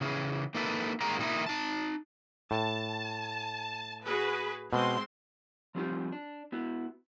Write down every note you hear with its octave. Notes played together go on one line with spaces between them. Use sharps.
C#3 E3 G#4
A#3 D#4 E4 A4 B4
D#3 G3 G#3 A#3 A#5
A#2 D#3 D#4 E4
D#4 A5
A2 A5
F#4 G#4 B4
B2 G#3 C4 C6
F3 G3 C4 D#4 F4 G4
D4
B3 E4 F#4